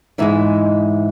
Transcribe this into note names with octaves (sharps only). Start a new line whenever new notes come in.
G#2 E3 G#3 E5